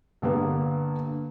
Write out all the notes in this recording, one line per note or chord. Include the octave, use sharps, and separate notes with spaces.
G2 D3 A#3 B3